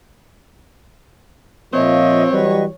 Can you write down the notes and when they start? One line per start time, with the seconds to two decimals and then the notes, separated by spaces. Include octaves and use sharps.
1.73 A#2 F3 C4 C#5 D#5 E5
2.32 E3 F#3 G3 B4 D#5 C#6